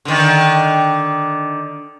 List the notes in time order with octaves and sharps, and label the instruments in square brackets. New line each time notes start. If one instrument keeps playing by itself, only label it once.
[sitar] D3 D#3